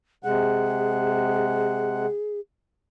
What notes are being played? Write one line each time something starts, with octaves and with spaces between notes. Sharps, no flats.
C3 G#3 G#4 F#5